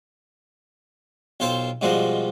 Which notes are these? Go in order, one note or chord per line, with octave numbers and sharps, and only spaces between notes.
B1 F4 A4 C5 G5
G#2 B2 F3 G3 F#4